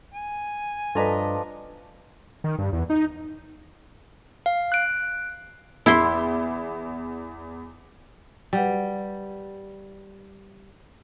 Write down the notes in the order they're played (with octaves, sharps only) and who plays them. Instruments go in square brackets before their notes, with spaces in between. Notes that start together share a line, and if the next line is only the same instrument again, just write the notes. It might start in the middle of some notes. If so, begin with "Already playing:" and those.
[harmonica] G#5
[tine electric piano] G2 A#5 [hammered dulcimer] F3 D4 D#5 [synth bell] A4 B4
[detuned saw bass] D#3
G2
E2
D#4
[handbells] F5
F#6 D7
[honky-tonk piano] E2 [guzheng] E4 C6
[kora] G3 [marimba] B4 F#5 G5